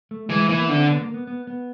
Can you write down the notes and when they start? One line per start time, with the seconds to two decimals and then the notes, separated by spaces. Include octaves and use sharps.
0.11 A3
0.30 E3 G#3
0.49 E3 A#3
0.62 B3
0.69 D3
0.76 C4
0.88 B3
1.01 A#3
1.14 B3
1.27 B3
1.47 B3